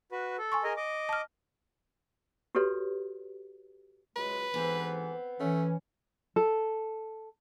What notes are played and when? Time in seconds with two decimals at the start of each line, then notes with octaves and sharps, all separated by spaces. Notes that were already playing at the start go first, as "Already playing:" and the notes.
0.12 F#4 B4
0.38 A4
0.52 G#5 C6 C#6
0.64 G#4 A#4 D#5
0.77 D#5 D6
1.09 A5 F6
2.55 F#4 G4 A4 B4 C#5
4.16 C#2 F#3 G#3 B4
4.54 D2 G#2 E3 B3 C4
5.40 E3 A3 C#4
6.36 A4